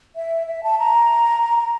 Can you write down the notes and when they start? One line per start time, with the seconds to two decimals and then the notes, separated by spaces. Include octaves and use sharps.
0.16 E5
0.47 E5
0.63 A5
0.79 A#5
1.42 A#5
1.58 A#5